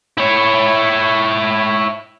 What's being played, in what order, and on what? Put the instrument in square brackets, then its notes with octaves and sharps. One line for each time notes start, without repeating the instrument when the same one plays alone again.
[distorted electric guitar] E4 C#5